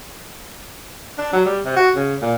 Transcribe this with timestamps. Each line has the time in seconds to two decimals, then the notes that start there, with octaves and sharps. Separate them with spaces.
1.18 D4
1.33 F#3
1.46 G3
1.65 C3
1.76 F#4
1.96 C#3
2.22 A#2